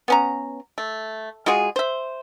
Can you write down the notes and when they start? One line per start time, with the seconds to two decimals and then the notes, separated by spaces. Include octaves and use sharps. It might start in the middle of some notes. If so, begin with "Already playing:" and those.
0.08 B3 C#4 A#5
0.78 A3
1.46 G#3 F4 F#4 G#4
1.76 C5 E5